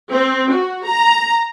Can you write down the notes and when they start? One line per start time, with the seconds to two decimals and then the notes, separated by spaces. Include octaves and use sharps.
0.11 C4
0.50 F#4
0.86 A#5